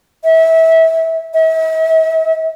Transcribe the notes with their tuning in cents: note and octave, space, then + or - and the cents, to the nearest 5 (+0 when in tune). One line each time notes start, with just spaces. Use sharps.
E5 -25
E5 -45